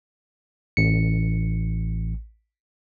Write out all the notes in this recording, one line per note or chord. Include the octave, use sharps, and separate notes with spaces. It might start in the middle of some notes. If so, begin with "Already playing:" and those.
A1 C#7